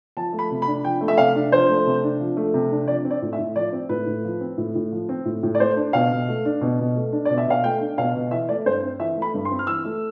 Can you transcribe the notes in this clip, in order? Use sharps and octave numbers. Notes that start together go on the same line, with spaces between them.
F3 A5
A3
B5
C3
B5
D4
F3 G5
A3
E5
C3 F5
D4
F3 C5
A3
C3
D4
F3
A3
C3
D4
F3 D5
C4
D5
A2
E5
A2
F3 D5
C4
A2 B4
A2
F3
C4
A2
A2
F3
C4
A2
A2
D5
A3 C5
D4
B2 F5
B2
A3
D4
B2
B2
A3
D4
B2 D5
E5
B2 F5
A3 G5
D4
B2 F5
B2
E3 E5
A3 D5
G2 C5
C4
E3 E5
A3
B5
G2
C6
C4
F6
E3 E6
A3